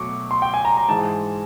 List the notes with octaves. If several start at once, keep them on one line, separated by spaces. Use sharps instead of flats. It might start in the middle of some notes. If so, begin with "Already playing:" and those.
Already playing: B2 F#3 A3 C#6 D6
C6
G5
G#5
A#5
A#5
G#2 E3 G#3 A5